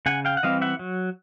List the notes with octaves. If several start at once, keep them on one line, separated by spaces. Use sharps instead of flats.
C#3 F#5 G#5
F5 G5
F#5
E3 G3 C4 D#5 F5
E5 F#5
F#3